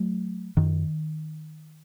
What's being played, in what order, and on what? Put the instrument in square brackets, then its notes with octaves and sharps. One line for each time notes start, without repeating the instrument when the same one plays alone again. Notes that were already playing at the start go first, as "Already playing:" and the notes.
Already playing: [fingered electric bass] F#3 A3
F#2 D#3